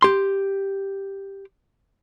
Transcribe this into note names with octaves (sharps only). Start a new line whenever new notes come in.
G4 C6